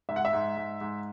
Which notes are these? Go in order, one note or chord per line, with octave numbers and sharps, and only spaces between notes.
G#2 E5
F#5
E5
G#2
G#2
G#2